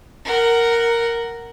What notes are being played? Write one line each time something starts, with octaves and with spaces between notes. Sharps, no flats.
A#4 F#5